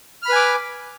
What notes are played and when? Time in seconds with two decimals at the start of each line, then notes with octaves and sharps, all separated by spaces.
0.22 F6
0.26 B5
0.29 B4
0.32 G#5
0.36 D6